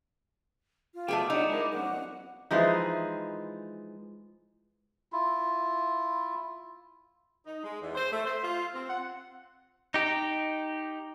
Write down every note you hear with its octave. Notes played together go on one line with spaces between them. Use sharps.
F4
F#3 G#3 A3 B3 G#4 G5 D6
D4 D#4 F#5 A#5
G#3 E4 A#4
B1 F2 C#4 F#5
E3 F3 G#3 D#4
E4 F4
D#4
G#3
E2
C5
A3
C5
F4
C4
F#5
D#4 G4